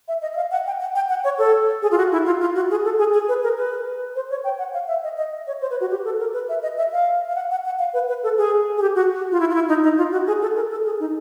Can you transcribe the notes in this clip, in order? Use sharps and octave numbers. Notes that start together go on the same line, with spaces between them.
E5
D#5
E5
F5
F#5
G5
F#5
G5
F#5
C#5
A4
G#4
F4
F#4
E4
F4
F4
F#4
G#4
A4
G#4
G#4
B4
A#4
B4
C5
C#5
G5
F#5
F5
E5
D#5
D#5
C#5
C5
B4
F#4
G4
A4
A#4
B4
E5
D#5
E5
F5
F5
F#5
F#5
F#5
F5
B4
B4
A4
G#4
G#4
G4
F#4
F4
E4
F4
E4
D#4
D#4
F4
F#4
G#4
A4
A#4
A4
G#4
D#4